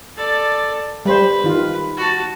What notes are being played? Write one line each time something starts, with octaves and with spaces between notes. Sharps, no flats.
A4 D5
G3 B4 C5
D#3 F4
F#4 A5